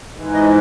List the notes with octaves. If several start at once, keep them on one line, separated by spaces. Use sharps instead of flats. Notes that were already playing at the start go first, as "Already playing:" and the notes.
G#2 E3
D#5